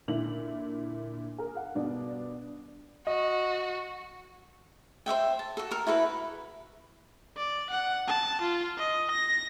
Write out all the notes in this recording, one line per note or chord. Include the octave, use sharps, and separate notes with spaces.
A#2 D3 E4 F#7
G#4 A#4
F5 F#5
G2 B2 D4
F#4 D#5
C5 D5 E5 G5
A5
F#4 A4
A4 A#4
E4 F#4 A4 B4
D5
F#5
A5
F4
D#5
A#6